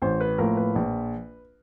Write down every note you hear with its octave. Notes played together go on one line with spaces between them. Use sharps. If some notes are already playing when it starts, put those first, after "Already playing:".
A1 C5
B4
A2 F3 A#3 A#4
B4
A#1